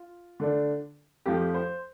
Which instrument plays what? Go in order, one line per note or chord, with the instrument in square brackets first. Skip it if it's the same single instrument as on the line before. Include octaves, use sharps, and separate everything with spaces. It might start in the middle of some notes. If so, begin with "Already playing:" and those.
Already playing: [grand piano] F4
D3 A3 D4
F2 F3 A3 G4
C5